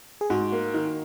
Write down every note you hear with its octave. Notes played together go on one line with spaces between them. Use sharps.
G#4
G#2 F#4
A#3
D#3